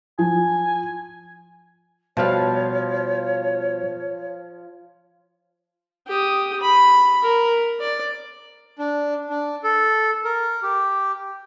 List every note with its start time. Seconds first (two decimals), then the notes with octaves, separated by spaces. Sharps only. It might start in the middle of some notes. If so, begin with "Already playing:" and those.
0.19 F3 G#5
2.17 B2 F3 G3 B4 C#5 F5
6.07 G4 D#6
6.61 B5
7.23 A#4
7.80 D5
8.78 D4
9.29 D4
9.64 A4
10.24 A#4
10.63 G4